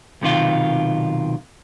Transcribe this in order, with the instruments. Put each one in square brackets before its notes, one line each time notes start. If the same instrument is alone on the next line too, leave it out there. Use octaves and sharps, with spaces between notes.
[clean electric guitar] B1 C3 D#3 F4